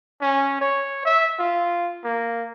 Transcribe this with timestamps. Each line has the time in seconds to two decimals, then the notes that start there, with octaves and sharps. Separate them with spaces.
0.22 C#4
0.61 C#5
1.05 E5
1.39 F4
2.04 A#3